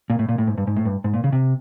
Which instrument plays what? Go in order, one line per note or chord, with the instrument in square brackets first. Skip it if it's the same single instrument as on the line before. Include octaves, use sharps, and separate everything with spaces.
[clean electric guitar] A#2
A2
A#2
A2
G#2
G2
G#2
A2
G2
G#2
A#2
C#3
C3